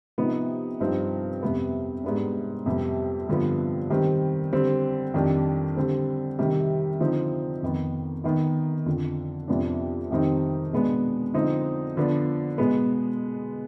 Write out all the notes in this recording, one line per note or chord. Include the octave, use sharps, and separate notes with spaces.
C3 F3 B3 D#4
G2 F3 C4 D#4
F2 C3 G3 B3
G#2 G3 B3 D4
F2 C3 G3 B3
G2 D3 F3 B3
D#3 G3 C4
D3 G3 C4
F2 D#3 G3 D4
D3 G3 C4
C3 D#3 G3
D3 F3 C4 D#4
F2 D#3 B3
D#3 B3 D#4
F2 D3 F3
F2 C3 F3 B3 D4
F2 D#3 G3 C4 D#4
B2 G#3 B3 D4
D3 F3 C4 D#4
D3 F3 B3 D4
B2 G#3 B3